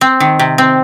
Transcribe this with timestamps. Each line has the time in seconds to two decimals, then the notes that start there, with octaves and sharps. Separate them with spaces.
0.01 C4
0.20 D#3
0.39 C3
0.58 C4